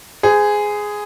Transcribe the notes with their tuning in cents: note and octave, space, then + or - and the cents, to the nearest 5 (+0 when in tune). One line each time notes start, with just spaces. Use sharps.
G#4 +0 C5 -40